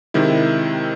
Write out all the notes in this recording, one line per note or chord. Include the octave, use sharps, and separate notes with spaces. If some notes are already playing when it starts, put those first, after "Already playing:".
C3 D#3 G#3 E4